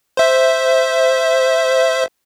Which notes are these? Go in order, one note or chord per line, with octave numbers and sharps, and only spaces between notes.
C5 E5